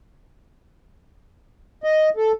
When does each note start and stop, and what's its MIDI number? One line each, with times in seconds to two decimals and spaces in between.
1.84 2.10 75
2.16 2.32 69